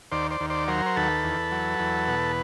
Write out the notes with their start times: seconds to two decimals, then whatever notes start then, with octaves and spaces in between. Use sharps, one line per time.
0.12 D#2 C5 D5
0.31 C5 D5
0.41 D#2
0.50 C5 D5
0.68 F#3 A#4 C5
0.86 C5
0.96 D#2 A4 B4
1.24 E2
1.52 F#3
1.79 E2
2.08 B2